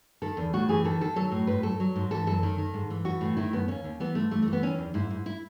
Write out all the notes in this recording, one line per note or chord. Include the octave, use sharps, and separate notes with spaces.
D#3 A4
E2
A2 F#4
E3 G#4
D#3 A4
D#3 A4
F#3 A4
A2
G#2 B4
F#3 A4
F#3
G#2
E3 A4
F#2 A4
D#3
D#3
G#2
E3
E3 F#4
A2
D#3 E4
F#2 B3
D#2 C#4
D#2
E3 B3
G#2 A3
E3 A3
A3
E3
B3
D#3 C#4
E2
G#2 E4
G#2
E4